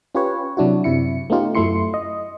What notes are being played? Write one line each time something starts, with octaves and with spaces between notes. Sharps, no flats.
C#4 F4 G4 B4 C#5
C3 F#3 D4 E4 F#4
F#2 C3 E4 C#7
A3 B3 C#4 D#4 F4 G4
F#2 F#3 A3 E4 C6 C#7
D#5